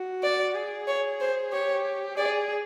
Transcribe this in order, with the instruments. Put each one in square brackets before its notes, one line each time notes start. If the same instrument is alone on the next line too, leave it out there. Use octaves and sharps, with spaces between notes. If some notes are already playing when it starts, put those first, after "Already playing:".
Already playing: [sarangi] F#4
[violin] D5
[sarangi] G#4
[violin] C#5
C5
[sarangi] G4 [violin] C#5
[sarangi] G#4 [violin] D5